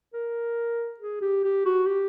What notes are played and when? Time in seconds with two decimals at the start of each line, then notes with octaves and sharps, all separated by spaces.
0.13 A#4
0.99 G#4
1.21 G4
1.44 G4
1.65 F#4
1.86 G4